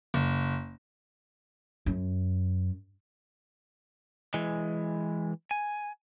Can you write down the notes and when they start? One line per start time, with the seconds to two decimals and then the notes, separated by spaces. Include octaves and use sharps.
0.14 F#1
1.86 F#2
4.34 E3 G#3
5.51 G#5